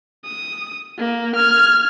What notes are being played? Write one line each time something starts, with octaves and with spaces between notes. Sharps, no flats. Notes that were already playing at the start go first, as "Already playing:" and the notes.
D#6
A#3
F6 G#6